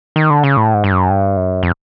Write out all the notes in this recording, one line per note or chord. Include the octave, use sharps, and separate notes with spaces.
D#3
D3
C#3
A2
G#2
G2
F#2
G2
F#2
F2